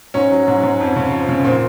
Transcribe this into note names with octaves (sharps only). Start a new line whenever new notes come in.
G#2 C#4
F#3
G#2
G#2
F2
C#3
F3
C#3
A#2 C4